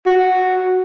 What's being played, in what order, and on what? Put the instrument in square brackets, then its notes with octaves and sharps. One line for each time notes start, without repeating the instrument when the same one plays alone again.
[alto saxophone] F#4